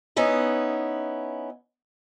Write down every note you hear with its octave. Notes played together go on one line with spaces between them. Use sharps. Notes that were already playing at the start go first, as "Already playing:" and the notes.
B3 C#4 D#4 E4